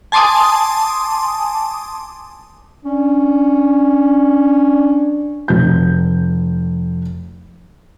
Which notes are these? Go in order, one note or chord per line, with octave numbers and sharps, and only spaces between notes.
G#5 A5 C6 D6 D#6
C#4 D4
F1 F#4 G6